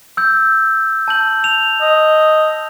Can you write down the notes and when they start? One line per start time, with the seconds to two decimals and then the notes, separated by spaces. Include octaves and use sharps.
0.17 E6 G6
1.08 A5 G6 F#7
1.44 F7
1.82 D#5